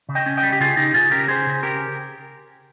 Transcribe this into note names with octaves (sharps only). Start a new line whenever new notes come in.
C#3
D#5 G5
C#4
D#5 G5
G3
G4
C#3 F4 G#4
C#3 D#4 G4
C#3 F4 G#4
C#4 G4 A#4
C#4 G#4 C5
C#3
C#4 G4 A#4